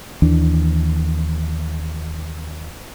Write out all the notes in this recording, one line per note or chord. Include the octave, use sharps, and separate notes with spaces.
D#2 E3 D4